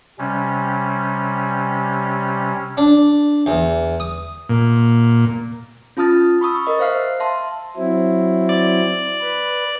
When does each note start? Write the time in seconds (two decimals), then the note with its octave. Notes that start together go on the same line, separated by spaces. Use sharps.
0.19 C3 G3 C#4
2.77 D4
3.46 E2
4.00 D#6
4.49 A#2
5.97 C#4 F4 A5 D#6 F6 A6
6.41 B5 C#6 D#6 E6
6.67 A#4 D#5
6.79 C5 E5 F5 F6 C7
7.20 E5 A5 C6
7.76 F#3 C4 E4
8.49 D5
9.21 B4